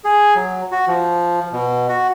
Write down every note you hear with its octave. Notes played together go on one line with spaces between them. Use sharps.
G#4
F#3
F#4
F3
B2
F#4